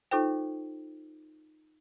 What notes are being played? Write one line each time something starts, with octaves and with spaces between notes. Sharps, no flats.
D#4 F4 A4 C5 G5